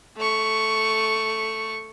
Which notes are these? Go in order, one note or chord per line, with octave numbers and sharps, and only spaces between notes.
A3 C#6